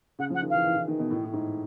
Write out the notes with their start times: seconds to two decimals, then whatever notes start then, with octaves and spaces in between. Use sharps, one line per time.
0.19 C#3 F#5
0.30 F3 F#5
0.42 D#3
0.49 E3 F5
0.65 E3
0.76 E3
0.88 D#3
0.99 B2
1.11 A2
1.24 A2
1.33 G#2